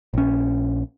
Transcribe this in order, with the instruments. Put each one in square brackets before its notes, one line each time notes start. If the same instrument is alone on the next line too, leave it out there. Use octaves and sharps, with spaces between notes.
[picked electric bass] A#1 C#4